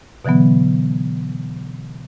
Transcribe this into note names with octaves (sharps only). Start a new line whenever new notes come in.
B2 D3 E3 F#3 B3